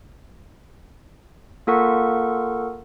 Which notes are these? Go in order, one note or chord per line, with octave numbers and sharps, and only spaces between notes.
A#3 F4 A4 A#4 F#5 C#6